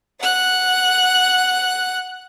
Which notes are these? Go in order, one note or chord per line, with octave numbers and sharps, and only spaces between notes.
F#5 F#6